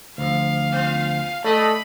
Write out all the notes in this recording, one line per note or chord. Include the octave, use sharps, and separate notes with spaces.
D2 F3 F5
B3 F4
A3 D5 D#5 B5